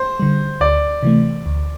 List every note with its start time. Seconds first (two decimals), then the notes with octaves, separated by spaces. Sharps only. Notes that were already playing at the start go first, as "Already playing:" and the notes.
Already playing: C5
0.20 D3 G3
0.61 D2 D5
1.03 C3 E3 A3
1.46 D2